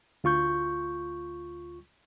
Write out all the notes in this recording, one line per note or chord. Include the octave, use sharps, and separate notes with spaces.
D2 F4 C#6 G6